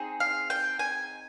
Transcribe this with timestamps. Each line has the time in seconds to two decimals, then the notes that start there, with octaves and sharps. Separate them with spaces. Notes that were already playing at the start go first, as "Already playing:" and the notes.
Already playing: C4 D#4 G#4
0.20 F5
0.50 G5
0.79 G#5